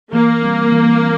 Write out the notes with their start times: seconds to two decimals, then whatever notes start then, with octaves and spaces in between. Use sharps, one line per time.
0.13 E3 A#3
0.42 G3 C4
0.72 E3
1.02 C4